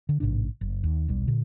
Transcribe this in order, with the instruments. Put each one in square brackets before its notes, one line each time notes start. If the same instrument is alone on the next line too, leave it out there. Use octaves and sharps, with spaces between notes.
[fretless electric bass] D3
A1 G#2 C3 D4
F#1
D#2
D#1 B1 G3
A#2 D3